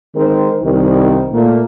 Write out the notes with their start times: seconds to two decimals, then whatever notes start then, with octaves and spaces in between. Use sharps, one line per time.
0.16 D#3 G#3 C4 A#4 C5
0.63 C2 D#3
1.33 A#2 A3 A#3